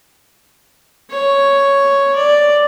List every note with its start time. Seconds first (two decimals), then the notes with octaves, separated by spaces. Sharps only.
1.10 C#5
2.16 D5